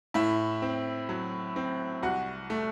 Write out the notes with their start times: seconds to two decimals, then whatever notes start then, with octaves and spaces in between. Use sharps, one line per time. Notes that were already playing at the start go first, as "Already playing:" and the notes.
0.14 A2 E4 E5
0.62 C4
1.09 F#3
1.56 C4
2.03 C2 F#4 F#5
2.50 A3